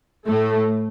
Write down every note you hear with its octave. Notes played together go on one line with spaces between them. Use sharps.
A2 A3